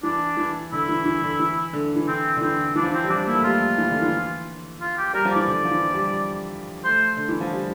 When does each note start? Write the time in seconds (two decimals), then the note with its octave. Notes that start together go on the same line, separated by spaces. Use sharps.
0.03 E3 D4
0.37 E3
0.72 D3 E4
0.89 E3
1.06 E3
1.23 D3
1.40 E3
1.73 D3
1.96 E3
2.08 D3 C4
2.37 D3
2.41 E3 C4
2.76 E3 D4
2.83 F3
2.91 E3 C4
3.04 G3
3.09 F3 D4
3.26 A#3 E4
3.35 A3
3.44 G3 F4
3.78 E3
3.90 D3
4.02 E3
4.81 F4
4.98 G4
5.14 G3 A#4
5.25 F3
5.32 E3 D5
5.48 D3
5.65 F3
5.71 E3
5.94 G3
6.84 A3 C5
7.17 D3
7.29 E3
7.41 F3
7.53 G3